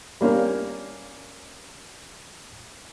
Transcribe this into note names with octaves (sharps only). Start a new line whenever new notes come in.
G3 A#3 C#4 F5